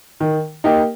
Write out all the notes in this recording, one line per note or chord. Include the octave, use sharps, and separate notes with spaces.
D#3
A#3 D#4 G4